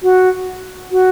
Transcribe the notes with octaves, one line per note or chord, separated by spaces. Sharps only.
F#4
F#4